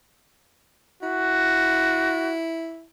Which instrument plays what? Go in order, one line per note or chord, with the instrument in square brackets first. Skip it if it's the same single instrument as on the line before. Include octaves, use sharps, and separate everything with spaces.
[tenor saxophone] E4 [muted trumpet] F#4